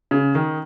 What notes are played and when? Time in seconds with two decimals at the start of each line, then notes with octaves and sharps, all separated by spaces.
0.11 C#3
0.35 D#3